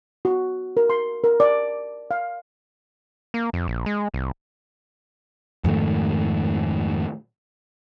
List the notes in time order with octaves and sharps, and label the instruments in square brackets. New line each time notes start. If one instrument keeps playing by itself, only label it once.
[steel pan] F#4
A#4
C6
A#4
D5
F5
[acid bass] A#3
F2
A#1
G#3
C2
[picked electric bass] F2 G#2 D#3 A3